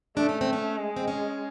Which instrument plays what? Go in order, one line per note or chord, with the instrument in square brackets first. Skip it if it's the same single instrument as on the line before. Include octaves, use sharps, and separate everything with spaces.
[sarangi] A3 [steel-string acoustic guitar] D4
[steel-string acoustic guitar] C#4
C4
C#4
[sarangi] G#3
[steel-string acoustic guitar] C4
C#4